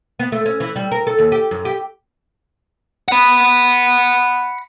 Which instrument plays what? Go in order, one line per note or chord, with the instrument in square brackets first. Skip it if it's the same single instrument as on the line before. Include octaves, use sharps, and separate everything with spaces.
[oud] B3
A3
C#4
E3
G3
A#4
A4
D#2
G4
F#2
G4
[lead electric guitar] F#5 B5